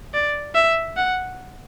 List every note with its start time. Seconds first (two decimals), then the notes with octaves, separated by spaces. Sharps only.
0.14 D5
0.55 E5
0.96 F#5